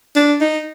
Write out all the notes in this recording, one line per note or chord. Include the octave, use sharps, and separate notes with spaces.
D4
D#4